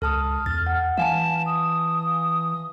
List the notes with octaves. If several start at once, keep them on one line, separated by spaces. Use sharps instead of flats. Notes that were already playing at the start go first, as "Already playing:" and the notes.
C#2 A4 A5 D#6 F6
E2 A6
F#5
E3 F5 G#5 A5 E7
D#6